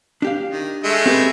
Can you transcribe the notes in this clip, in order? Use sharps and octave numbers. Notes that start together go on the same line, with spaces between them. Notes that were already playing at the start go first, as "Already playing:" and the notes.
D4 G4 F5
D#3
G#3 A3 E5
C4 G4 B4